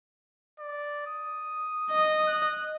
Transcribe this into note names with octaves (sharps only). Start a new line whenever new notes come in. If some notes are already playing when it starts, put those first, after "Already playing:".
D5
D#6
D#5
F#6